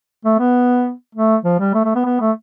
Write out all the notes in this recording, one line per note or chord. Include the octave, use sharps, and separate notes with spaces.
A3
B3
A3
F3
G3
A3
A3
B3
B3
A3